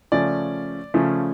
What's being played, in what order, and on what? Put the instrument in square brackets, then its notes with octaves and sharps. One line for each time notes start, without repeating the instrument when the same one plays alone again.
[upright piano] C#3 F3 A3 C#4 D5
C#3 F3 A3 C#4